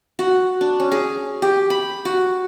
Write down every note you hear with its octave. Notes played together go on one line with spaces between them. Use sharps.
F#4
D4
C#4
G#4
G4
B5
F#4